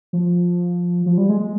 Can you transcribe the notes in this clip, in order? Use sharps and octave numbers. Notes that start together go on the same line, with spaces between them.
F3
F3
G3
G#3
G#3